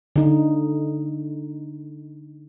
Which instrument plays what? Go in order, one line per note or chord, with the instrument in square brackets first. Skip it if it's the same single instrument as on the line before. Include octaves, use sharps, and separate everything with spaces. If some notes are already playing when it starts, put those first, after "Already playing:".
[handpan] D3 D#4